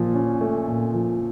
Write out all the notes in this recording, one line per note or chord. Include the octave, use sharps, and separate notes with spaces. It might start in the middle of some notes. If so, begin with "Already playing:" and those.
Already playing: A#2 F3
C#4
A3
A#2
F3